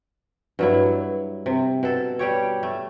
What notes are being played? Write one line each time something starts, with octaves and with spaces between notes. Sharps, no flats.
G2 F#3 E4
C3
B2 A4
G3 G4 C#5
A3